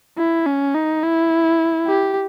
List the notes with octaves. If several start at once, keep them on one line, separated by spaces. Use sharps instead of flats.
E4
C#4
D#4
E4
G4